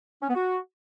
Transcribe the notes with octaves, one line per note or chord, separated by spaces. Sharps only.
C#4
B3
F#4